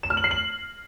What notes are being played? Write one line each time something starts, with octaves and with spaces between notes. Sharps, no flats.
E7
F6
F#7
C7
F#7